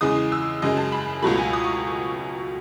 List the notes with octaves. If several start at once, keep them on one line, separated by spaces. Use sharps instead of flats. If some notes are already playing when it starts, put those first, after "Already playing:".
E2 C#3 E3 G#3 D#6
E6
F#2 C#3 G#3 D#5
A5
B5
C#2 B2 F#3 A3 B5
G#5
D#6
C#6